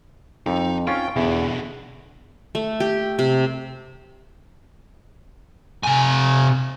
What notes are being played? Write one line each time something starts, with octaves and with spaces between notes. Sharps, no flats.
F2 D#4
C#4 F4 G5
E2 B2 D3
A3
G4
C3
C3 G#5